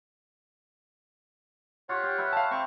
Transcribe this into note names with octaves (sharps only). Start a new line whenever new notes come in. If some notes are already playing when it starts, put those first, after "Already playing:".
F4 G4 C#5 F#5
G4
B4 E5 G5
F5 A5
C4 G5 C#6